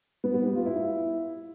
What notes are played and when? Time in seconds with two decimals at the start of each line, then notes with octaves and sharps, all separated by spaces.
0.24 B3
0.34 B3
0.45 G4
0.55 F4
0.66 E4